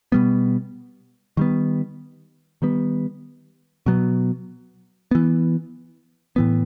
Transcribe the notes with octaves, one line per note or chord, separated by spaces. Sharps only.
B2 G3 B3
D#3 G3 B3
D#3 G3 B3
B2 F#3 B3
E3 B3
A2 E3 B3